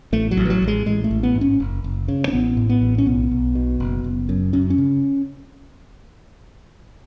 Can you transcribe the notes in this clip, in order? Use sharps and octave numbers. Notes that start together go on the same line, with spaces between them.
A1 A3
F#3
A1
E3
F#3
A1
G#3
A1 G#3
A3
A1
B3
G#2
C#4
F#1
F#1
C#3
C#4
A1 B3
A2
B3
A1
C#4
B1 B3
B1
B2
F#1
F#1
F#2
F#2 C#4
C#4
C#3